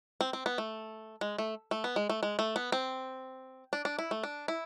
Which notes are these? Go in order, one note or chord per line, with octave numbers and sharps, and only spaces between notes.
C4
C4
B3
A3
G#3
A3
A3
B3
G#3
A3
G#3
A3
B3
C4
D4
D4
E4
A3
D4
E4